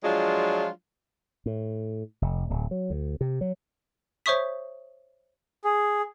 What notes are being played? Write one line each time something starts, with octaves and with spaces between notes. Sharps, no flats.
F3 F#3 G#3 D4 F4
A2
F1
D1
F#3
D2
C3
F#3
C5 C#5 E5 C#6 D#6 B6
G#4